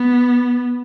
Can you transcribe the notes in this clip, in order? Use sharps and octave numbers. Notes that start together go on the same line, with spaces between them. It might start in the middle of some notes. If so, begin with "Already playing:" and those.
Already playing: B3